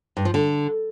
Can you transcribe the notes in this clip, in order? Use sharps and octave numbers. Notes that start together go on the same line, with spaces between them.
G2
F3
D3